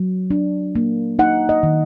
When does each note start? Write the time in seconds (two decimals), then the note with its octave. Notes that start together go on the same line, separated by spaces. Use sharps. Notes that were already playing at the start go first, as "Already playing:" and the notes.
Already playing: F#3
0.30 D4
0.75 A#3
1.19 D#4 F#5
1.49 D#5
1.63 D#3